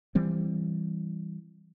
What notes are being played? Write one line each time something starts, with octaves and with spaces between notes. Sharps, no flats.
E3 G3 C4